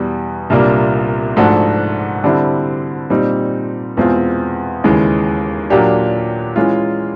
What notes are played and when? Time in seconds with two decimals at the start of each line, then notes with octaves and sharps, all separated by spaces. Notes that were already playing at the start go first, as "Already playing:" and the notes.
Already playing: E2 B2 G3
0.50 C2 A#2 G3 A#3 D4
1.37 G#2 F3 A3 D4 F#4
2.24 D3 G3 C4 E4
3.10 A#2 G3 C4 D#4
3.97 E2 B2 G#3 C4 F4
4.84 D#2 C#3 E3 G#3
5.70 A#2 F#3 A#3 D4 G4
6.56 E3 G#3 C#4 F4